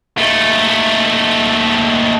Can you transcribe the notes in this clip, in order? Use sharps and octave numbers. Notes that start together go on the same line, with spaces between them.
D#2 A3